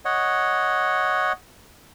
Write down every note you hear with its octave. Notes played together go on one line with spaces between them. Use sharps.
C#5 D#5 F#5